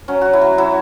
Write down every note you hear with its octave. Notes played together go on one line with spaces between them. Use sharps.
F#3 C#4
F#3 F#4
E4
F#3
F#3 E4